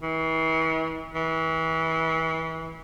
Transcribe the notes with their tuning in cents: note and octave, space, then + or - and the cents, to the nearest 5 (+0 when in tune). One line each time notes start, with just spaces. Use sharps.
E3 -40
E3 -30